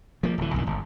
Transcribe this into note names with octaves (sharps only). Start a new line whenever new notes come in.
F3 A#3
D1 E3
B1 F2 D#3
G1